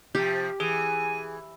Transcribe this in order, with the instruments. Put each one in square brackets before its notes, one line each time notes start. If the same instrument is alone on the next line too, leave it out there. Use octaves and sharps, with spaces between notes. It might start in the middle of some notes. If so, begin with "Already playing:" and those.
[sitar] C3 F3 [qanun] G4
[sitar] E3 [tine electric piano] G#4 [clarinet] G#5